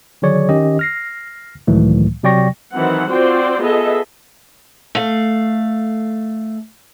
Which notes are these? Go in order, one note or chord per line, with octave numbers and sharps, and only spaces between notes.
D3 D#3 F#3 G#4 C#5 D5
D#3 C#4 G4 D#5
F6 A#6 C7
C#2 A2 D#3 E3 F#3 A3
C3 F#3 D5 G5 C#6 A#6
D#3 E3 F#3 C4 F#5
C4 F4 F#4 C5 D5 G5
B3 G#4 A4 D#5 E5
A3 F5